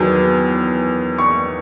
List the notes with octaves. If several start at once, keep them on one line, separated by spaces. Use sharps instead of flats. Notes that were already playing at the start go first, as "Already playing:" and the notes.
Already playing: E2 D#3 F#3
C#6